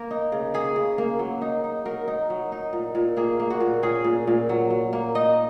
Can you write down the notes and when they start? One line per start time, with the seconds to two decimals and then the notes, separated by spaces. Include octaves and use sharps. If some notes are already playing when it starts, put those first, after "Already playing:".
Already playing: A#3 A#4
0.11 D#4
0.32 C#3
0.54 A#3 G#4
0.76 C#3
0.98 A#3
1.19 F#3
1.42 D#4
1.64 D#4
1.85 F#3 A#4
2.08 D#4
2.30 F#3
2.52 D#4
2.73 A#2
2.95 A#2
3.17 A#3 G#4
3.40 A#3
3.50 F#4
3.60 A#2
3.82 C#4 G#4
4.04 A#2
4.27 A#2
4.49 F#3
4.70 F#3
4.93 A#3
5.15 D#4 D#5